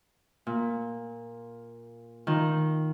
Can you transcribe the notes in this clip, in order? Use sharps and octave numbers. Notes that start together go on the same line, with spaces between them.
A#2
D#3 F4